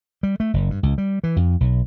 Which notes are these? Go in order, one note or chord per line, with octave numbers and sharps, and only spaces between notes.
G3
A3
F#1
G2
C#2
G3
E3
F2
B1